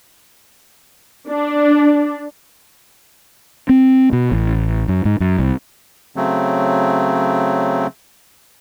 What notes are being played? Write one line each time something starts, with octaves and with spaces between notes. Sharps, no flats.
D4
C4
B2
A1
F#2
G#2
F#2
C2
C#3 F#3 A3 C4